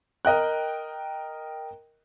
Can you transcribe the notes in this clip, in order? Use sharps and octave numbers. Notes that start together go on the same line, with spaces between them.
A#4 D#5 G5 F#6